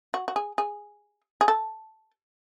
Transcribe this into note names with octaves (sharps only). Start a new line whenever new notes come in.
F#4
F#4
G#4
G#4
G#4
A4